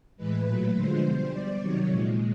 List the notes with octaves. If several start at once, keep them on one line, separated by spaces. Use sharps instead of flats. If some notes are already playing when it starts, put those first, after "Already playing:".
A2 E3 G#3 B4
A#2 F#3 A3
D3 F3 G#3 C5
B2 G3
B2 G3 D5
C3 D#3 F#3 C#5
A#2 F3 G#3